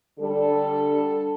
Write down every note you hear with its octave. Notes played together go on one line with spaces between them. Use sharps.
D3 G3 D4 A4